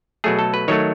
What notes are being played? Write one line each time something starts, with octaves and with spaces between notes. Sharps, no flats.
B2 F#3 A3 G#4
A4
B4
D#3 F#3 A3 C#5